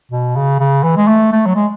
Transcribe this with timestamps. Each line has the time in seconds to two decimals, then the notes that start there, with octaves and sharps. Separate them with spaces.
0.12 B2
0.36 C#3
0.60 C#3
0.84 E3
0.97 G#3
1.08 A3
1.32 A3
1.46 F#3
1.55 G#3